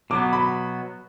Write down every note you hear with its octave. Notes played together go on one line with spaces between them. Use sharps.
B2 F#3 B3 D6
B5